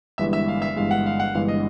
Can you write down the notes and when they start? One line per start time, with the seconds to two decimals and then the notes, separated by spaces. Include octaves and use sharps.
0.18 G1 G2 E3 G#3 E5
0.33 E5
0.48 F5
0.62 E5
0.76 G1 G2 E3 G#3 F5
0.91 F#5
1.06 F5
1.20 F#5
1.35 G1 G2 E3 G#3 F5
1.48 D#5